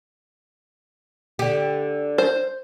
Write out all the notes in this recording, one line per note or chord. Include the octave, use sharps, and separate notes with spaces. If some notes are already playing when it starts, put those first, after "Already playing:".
D3 G4
C5